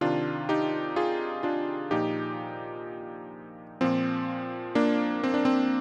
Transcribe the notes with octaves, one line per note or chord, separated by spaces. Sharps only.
C3 D#3 D4 F4
D#4 G4
F4 G#4
D4 F4
A#2 F3 D#4 G4
A#2 F3 C4
A#3 D4
C4
D4
C4